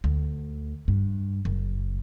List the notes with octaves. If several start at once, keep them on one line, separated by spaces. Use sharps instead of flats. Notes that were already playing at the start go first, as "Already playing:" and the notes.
D2
G2
F#1